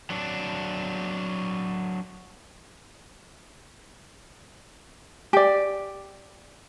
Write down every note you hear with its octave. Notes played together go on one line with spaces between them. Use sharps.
F#3 D4
G4 D5